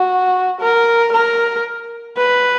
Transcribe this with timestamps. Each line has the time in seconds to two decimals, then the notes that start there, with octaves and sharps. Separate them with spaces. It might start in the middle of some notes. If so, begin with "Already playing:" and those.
Already playing: F#4
0.60 A#4
1.12 A#4
2.17 B4